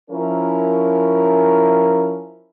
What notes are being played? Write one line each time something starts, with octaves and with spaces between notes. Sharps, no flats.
F3 C#4 E4 A#4